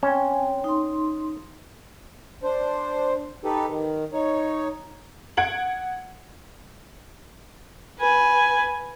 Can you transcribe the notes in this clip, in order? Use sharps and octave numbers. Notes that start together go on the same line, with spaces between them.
C4 C#4 G5
D#4 C6
D4 C5
D#4 G4 A4 B4
D#3
D#4 C#5
F#5 G#6 D7 F#7
B4 G#5